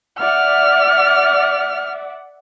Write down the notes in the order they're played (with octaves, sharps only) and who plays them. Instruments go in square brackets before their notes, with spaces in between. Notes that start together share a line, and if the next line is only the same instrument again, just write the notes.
[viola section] D5 E5 F#5 [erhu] F6